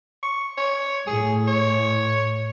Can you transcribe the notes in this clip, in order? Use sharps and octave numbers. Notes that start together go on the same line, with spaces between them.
C#6
C#5
A2 G#4
C#5